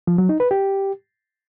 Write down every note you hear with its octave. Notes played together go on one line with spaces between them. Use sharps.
F3
F#3
D#4
B4
G4